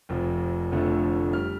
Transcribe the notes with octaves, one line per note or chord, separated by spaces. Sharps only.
F1 F2 F3
F1 F2 D3 F3 A3
G3 F6